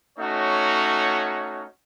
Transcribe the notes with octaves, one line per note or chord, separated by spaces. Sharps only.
A3 C#4 D#4 F#4 C#5